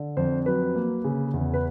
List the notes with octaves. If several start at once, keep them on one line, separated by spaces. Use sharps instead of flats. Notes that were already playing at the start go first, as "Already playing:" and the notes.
Already playing: D3
F2 C5
F#3 B4
A#3
C#3
E2
B4